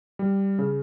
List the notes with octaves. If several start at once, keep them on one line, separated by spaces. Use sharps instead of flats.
G3
C#3